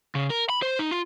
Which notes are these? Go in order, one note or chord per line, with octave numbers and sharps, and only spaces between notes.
C#3
A#4
B5
C5
D#4
F4